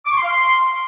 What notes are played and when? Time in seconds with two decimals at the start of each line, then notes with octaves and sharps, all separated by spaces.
0.06 D6
0.11 C#6
0.17 C6
0.23 F5
0.28 C6